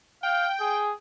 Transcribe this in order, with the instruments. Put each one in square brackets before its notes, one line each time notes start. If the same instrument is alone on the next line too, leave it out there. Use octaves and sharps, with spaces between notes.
[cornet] F5 [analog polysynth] G5
[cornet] G#4